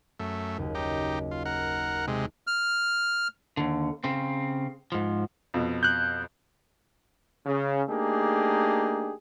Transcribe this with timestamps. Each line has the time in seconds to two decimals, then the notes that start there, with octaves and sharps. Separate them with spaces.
0.19 F#2 A3
0.58 F#1 D#2
0.75 D#4 G4
1.31 F4
1.45 A#4 F#5
2.08 C3 G#3
2.47 F6
3.57 D#2 D3
4.04 C#3 C4
4.92 G#2 F3
5.54 F2 B2
5.83 F#6 G6
7.46 C#3
7.89 A3 A#3 D4 D#4 G4 G#4